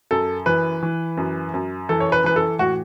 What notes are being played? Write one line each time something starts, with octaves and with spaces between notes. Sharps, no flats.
F#2 A4
E3 B4
E3
F#2
F#2
E3 A4
C#5
B4
E3 B4
A4
A2 F#4